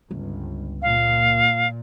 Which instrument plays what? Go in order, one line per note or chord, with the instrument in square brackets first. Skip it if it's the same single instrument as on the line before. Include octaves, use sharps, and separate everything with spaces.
[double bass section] G1 [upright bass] C#2
[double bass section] A#2 [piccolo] F5